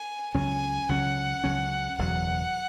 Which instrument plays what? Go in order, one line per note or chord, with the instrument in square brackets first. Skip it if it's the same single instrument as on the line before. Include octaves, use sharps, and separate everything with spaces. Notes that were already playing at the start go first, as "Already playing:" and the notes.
Already playing: [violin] G#5
[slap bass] C#2 C#3 F#3 C#4 [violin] G#5
[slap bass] C#2 C#3 F#3 C#4 [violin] F#5
[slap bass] C#2 C#3 F#3 C#4
[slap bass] F#1 E2 B2 F#3 [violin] F#5